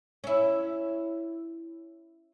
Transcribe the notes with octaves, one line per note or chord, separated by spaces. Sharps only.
C#4 E4